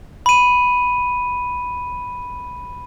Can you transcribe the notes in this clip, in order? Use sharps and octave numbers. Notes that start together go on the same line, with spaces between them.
B5 D#7